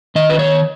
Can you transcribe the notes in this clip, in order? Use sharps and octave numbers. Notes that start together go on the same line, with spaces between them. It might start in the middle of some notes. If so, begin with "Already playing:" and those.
D#3 D#5
B4
C#5